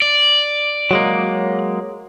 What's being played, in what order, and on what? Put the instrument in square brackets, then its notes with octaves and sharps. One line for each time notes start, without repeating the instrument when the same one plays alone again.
[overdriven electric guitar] D5
[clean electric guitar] F#3 G#3 A#3